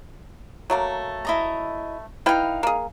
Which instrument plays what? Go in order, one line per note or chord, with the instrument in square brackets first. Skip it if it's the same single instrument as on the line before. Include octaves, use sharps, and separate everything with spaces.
[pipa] F#3 A3 A#3
[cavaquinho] E4 D#5 A#5
[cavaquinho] D#4 F5 [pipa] E4 B4 G5
[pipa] A#3 G#4